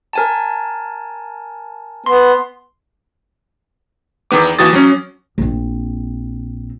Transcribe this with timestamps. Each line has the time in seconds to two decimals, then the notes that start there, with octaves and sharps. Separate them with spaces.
0.13 A#4 G#5 A5
2.06 B3 C6
4.31 E2 D#3 B3 D6
4.59 D#2 E3 F#4 D#6 A6
4.73 F#3 C#4
5.38 A#1 C4